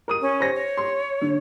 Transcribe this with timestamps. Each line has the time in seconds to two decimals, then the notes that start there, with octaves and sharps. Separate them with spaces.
0.08 A#4 D#6 D#7
0.22 C#4
0.40 C5 A#6
0.54 C#5
0.77 C6
1.21 D3